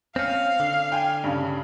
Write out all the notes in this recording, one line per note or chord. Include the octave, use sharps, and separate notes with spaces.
C4 C#4 F5 F6
D3
G5 G#5
G2 C#3